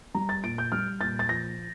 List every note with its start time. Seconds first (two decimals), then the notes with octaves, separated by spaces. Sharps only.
0.15 G3 A#5
0.29 A6
0.43 A#2 D7
0.58 G6
0.72 G3 F6
1.01 A#2 A6
1.19 A6
1.29 F3 A#6